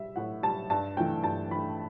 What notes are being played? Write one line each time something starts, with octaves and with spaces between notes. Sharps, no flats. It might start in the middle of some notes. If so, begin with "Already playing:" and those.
Already playing: G3 E5
A2 F#5
G3 A5
G2 A5
E3 A3 G5
G2 A5
E3 A3 B5